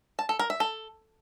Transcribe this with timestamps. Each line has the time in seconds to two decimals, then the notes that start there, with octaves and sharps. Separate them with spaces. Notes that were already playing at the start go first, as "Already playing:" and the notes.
0.19 A5
0.29 A4
0.39 A#4
0.50 E5
0.60 A4